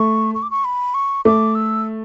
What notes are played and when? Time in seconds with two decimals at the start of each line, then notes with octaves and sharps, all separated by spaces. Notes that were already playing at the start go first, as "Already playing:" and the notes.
Already playing: A3 C#6
0.35 C#6
0.42 D6
0.51 C#6
0.64 B5
0.94 C#6
1.25 A3 D6
1.55 E6